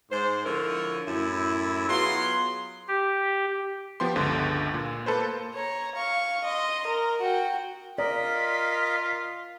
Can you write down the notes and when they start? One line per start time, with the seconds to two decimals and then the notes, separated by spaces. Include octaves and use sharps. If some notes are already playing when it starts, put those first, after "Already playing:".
0.11 G#2 C5
0.45 D3 F3 E4 A#4 C#5
1.08 F#2 A2 E4
1.89 F#3 B3 F4 G#4 C6
2.88 G4
4.00 F3 B3 G4 C6
4.16 G1 C#2 D3
4.74 A#2
5.06 A#3 A4 B4 C5
5.54 C#5 A#5
5.96 F5 C#6
6.44 D#5 C6
6.87 A#4
7.21 F#4 G5
7.98 F4 A#4 D5 D#5 B6